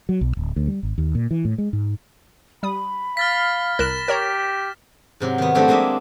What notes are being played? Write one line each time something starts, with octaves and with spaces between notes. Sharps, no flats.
F#3
B1
D1
D2
G3
G#1
D#2
A#2
E3
A2
G#3
G#2
G3 B5 D#6
F5 F6 A6 B6
C2 A#4 F#6 A#6 E7
G4 A#4 C#5 A#5
G#2 C3 F#3
D#3 B3
F3 A3 C4 D4 F#4 G4
G#3 A#3 D4 D#5 E5